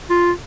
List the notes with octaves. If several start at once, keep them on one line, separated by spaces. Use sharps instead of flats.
F4